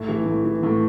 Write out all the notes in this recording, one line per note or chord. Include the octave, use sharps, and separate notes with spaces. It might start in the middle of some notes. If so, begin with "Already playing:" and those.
Already playing: A2 E5
E3
A2
E3
A2